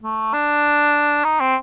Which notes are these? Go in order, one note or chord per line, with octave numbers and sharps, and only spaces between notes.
A3
D4
D#4
C4